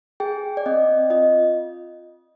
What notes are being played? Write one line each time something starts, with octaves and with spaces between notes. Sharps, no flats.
G#4 G5
D5
C4 D#5
F4 D#5